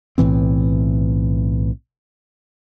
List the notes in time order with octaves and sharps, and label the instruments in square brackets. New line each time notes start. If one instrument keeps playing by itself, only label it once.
[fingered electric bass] B1 A2 E3 C4